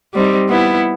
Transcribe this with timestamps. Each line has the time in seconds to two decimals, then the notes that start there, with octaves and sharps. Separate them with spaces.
0.14 G3 C4 D#4
0.49 B3 E4